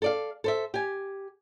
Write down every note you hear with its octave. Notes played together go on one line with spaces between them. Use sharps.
A4 D5 F5
A4 C5 E5
G4 G#5